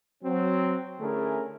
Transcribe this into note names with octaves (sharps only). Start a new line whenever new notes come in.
F#3 C4
D3 A3 C#4 E4 G#4 A#4